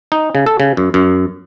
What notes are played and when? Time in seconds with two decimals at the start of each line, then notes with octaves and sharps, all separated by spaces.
0.12 D#4
0.35 C#3
0.46 A4
0.60 C#3
0.77 F#2
0.94 F#2